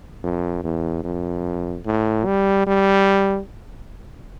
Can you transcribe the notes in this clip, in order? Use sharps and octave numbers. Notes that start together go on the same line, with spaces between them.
F2
E2
F2
A2
G3
G3